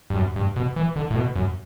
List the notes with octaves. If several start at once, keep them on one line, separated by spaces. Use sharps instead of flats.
G2
F#2
G2
B2
E3
D3
A2
B2
F#2